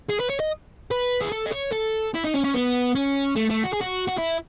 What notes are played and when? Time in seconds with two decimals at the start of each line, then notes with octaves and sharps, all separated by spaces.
0.10 G#4
0.20 B4
0.30 C#5
0.40 D#5
0.91 B4
1.21 G#4
1.32 A4
1.46 D#5
1.52 C#5
1.73 A4
2.15 E4
2.25 D#4
2.34 C#4
2.44 C#4
2.55 B3
2.95 C#4
3.36 A3
3.50 A3
3.64 F#4
3.73 G#4
3.81 F#4
4.07 F#4
4.18 E4